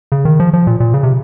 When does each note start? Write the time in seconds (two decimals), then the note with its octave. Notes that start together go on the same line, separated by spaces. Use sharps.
0.12 C#3
0.25 D#3
0.40 F3
0.53 F3
0.67 A#2
0.80 A#2
0.94 C#3
1.03 C3